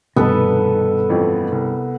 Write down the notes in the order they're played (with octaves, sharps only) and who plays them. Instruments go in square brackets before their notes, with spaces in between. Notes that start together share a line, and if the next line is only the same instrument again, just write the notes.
[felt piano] F1 [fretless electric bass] G2 B2 D#3 [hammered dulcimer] B3 A4 B4
[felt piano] A1 F2 F3
C2